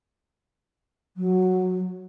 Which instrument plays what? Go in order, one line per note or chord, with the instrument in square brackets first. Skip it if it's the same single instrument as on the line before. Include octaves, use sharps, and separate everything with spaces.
[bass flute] F#3